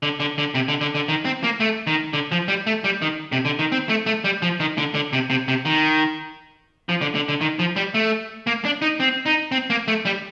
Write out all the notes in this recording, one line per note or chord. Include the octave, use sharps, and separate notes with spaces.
D3
D3
D3
C3
D3
D3
D3
D#3
C4
A#3
A3
D#3
D3
F3
G3
A3
G3
D#3
C3
D3
D#3
C4
A3
A3
G3
F3
D#3
D3
D3
C3
C3
C3
D#3
F3
D3
D3
D3
D#3
F3
G3
A3
A#3
D4
D#4
C4
D#4
C4
A#3
A3
G3